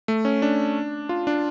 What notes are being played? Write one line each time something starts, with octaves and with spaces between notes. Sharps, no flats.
A3
C#4
D4
F4
D4